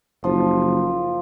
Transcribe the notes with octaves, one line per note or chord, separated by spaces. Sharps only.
F#1 F3